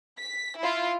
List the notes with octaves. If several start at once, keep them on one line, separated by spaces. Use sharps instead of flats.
B6
E4 F4